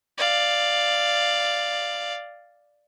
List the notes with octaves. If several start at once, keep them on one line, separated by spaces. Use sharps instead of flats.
D5 F5